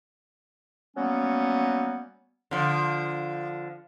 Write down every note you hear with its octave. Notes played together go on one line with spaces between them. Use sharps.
F#3 G3 A#3 B3 C#4
D3 F3